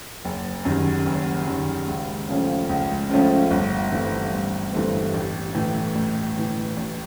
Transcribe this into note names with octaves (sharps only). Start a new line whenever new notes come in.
F#1
F#2 D#3 G3
F#1
F#2 D#3 G3
C#2
C#3 F3 A3 C#4
C#2
C#3 F3 A3 C#4
G1
G2 E3 A3 C4
G1
G2 E3 A3 C4
A1
A2 E3
A1
A2 E3
A1